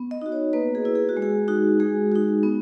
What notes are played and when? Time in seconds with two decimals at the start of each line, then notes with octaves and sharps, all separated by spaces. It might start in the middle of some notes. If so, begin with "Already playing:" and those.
Already playing: B3
0.11 D#5
0.22 D#4 F#4
0.32 C#5
0.53 A#3 B4
0.75 G#4
0.85 E4
0.95 G#4
1.09 F#4
1.17 G#3
1.22 G#4
1.48 D#4 F#4
1.80 G#3 G#4
2.12 D#4 F#4
2.43 B3